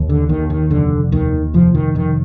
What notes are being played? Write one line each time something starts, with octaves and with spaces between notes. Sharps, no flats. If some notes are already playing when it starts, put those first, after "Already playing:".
Already playing: D#2
D3
D#2 D#3
D#3
F1 D3
D#2 D#3
F1 F3
D#3
F1 D#3